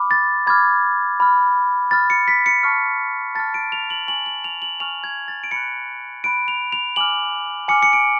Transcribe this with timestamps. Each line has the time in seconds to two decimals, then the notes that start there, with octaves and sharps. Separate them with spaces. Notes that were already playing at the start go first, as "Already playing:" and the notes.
Already playing: B5 D6 F6
0.11 A6
0.47 B5 D6 F6 G#6
1.20 B5 F6
1.91 B5 F6 A6
2.10 C#7
2.28 B6
2.46 C#7
2.63 A5 C#6 F6
3.35 A5 C#6 F6 A6
3.54 D7
3.72 F7
3.90 F#7
4.07 G#5 C#6 F6 F#7
4.26 F#7
4.44 F7
4.62 F#7
4.80 G#5 C#6 F6 F7
5.04 G#6
5.28 A6
5.44 D7
5.51 B5 F#6 C#7
6.24 B5 F#6 D7
6.48 F7
6.72 F7
6.96 G#5 D6 F6 F#7
7.68 G#5 D6 F6 C#7
7.83 C#7
7.93 D7